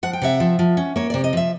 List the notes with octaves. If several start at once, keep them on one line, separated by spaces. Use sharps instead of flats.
F3 F#5
G5
C3 E5 F#5
F3
F3
C#4
A#3 C#5
C3 D5
D#5
F3 E5